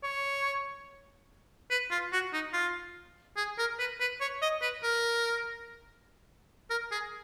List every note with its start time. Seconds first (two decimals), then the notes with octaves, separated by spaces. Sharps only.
0.03 C#5
1.71 B4
1.91 F4
2.13 F#4
2.33 D#4
2.53 F4
3.37 G#4
3.59 A#4
3.79 B4
4.00 B4
4.21 C#5
4.42 D#5
4.62 B4
4.83 A#4
6.70 A#4
6.92 G#4